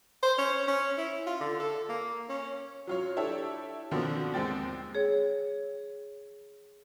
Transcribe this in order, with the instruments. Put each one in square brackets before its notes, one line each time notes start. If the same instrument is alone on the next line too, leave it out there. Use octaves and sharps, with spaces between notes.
[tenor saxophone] C5
C#4
C#4
E4
F4
D3
A4
A#3
C#4
[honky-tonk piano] F#3 F4 C#5
D4 E4 G4 A4 C#5
B2 D3 D#3 F3 A#3 C4
D#2 G#3 C4 G5 A6
[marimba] G#4 C#5